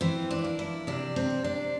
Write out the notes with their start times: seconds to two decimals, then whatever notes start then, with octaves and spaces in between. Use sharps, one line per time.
0.01 E3 C4
0.31 D4
0.44 A#3
0.59 E4
0.87 C3 D4
1.16 C4
1.30 C3
1.44 D4